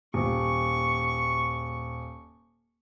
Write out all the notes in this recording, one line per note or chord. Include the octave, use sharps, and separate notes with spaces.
D#1 C#6